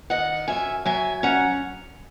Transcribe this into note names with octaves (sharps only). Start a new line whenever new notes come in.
D#3 D#5 F#5
F#2 E5 G#5
F#3 E5 G#5
C#4 F#5 A#5